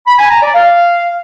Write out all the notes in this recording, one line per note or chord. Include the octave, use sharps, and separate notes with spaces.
B5
G#5
A#5
D5
F5